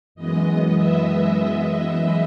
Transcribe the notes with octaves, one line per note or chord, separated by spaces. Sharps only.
F#2 E3 G#3 B3 D#5
E5